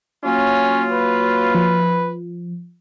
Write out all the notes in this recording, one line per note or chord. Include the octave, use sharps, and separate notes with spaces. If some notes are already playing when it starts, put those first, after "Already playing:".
F#3 A#3 C#4 F4
B4
F3